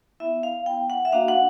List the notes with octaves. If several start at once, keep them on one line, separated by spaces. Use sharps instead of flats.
B3 E4 E5
F5
B3 E4 G5
F#5
E5
A#3 D4 F#4 F5
F#5